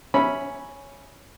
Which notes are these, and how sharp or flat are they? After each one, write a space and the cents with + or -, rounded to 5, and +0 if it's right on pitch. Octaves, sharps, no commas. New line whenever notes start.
C#4 +0 E5 +0 B5 -10